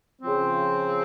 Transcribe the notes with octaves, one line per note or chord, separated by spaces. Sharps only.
C#3 F3 C4